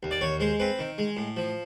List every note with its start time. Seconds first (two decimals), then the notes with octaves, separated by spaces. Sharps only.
0.03 D#2
0.11 D5
0.21 D#2 C#5
0.40 G#3 C5
0.60 C4 B4
0.79 D#3
0.98 G#3
1.17 A2
1.37 F3